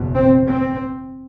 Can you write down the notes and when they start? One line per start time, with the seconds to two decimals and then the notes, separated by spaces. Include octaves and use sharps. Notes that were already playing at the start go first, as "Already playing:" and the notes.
Already playing: F#1 E2 B2
0.14 C4
0.47 C4